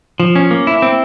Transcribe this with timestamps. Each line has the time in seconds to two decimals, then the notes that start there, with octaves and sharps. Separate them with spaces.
0.20 F3
0.36 C#4
0.51 A#3
0.67 E4
0.82 C4